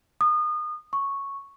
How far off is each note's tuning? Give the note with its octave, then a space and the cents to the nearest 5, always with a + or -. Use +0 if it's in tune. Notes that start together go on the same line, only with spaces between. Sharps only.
D#6 -30
C#6 -5